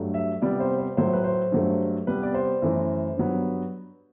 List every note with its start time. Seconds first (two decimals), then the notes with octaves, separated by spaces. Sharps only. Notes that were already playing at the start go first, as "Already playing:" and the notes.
Already playing: G2 F#3 A3
0.14 E5
0.42 C3 G3 B3 D5
0.60 C5
0.79 C5
0.97 A2 F#3 A3 C5
1.13 B4
1.24 C5
1.52 G2 F#3 A3
2.07 C3 G3 B3 B4
2.23 D5
2.34 C5
2.62 F#2 E3 A3
3.17 G2 F#3 B3